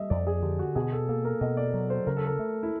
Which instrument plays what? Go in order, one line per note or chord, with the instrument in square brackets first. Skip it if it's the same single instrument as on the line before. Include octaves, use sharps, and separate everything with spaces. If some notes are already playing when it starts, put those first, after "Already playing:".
Already playing: [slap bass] G3 [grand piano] D#5 E5
[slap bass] F2 [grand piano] D5
[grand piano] G#4
[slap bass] D3 [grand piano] G4
[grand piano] F#4
[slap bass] B2 [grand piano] G#4
[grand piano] A4
[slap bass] A#3 [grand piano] A4
[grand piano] A#4
[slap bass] B2 [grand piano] D#5
[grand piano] D5
[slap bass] F#3
[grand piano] C5
[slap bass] C#3 [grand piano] A#4
[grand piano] A4
A#4
[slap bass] A3
[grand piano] E4